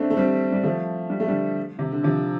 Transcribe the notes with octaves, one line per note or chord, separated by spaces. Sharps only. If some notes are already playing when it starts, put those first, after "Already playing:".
Already playing: A3 C4 D4
A3
G3 C4
G3
F3 A3
G3
A3
D3 G3
C3
D3
C3 F3